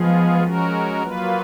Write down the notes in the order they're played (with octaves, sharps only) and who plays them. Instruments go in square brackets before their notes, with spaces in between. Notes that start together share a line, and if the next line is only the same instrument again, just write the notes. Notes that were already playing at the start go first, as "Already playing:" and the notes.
Already playing: [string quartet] F3 [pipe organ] G#3 B3 F4 G#4
[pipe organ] G#3 C#4 F#4 A#4
F#3 A#3 F4 B4